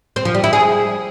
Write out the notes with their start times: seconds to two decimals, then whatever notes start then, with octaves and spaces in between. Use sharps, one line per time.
0.16 C4
0.25 F3
0.34 G3
0.44 E4
0.53 G#4